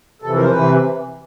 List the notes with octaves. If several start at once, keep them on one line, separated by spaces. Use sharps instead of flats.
F2 C3 E3 A4
A#4
C5
C3 E3 B4